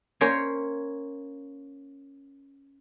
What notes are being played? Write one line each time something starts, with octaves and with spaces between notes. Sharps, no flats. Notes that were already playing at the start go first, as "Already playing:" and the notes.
A#3 C#4 C5 C#5